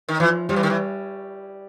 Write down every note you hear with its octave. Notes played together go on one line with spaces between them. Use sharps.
D#3
E3 F3
F3 G3
E3
D#3
E3